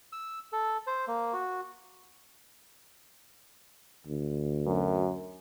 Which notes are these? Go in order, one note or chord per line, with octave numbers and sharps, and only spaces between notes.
E6
A4
C5
A#3
F#4
D2
F#2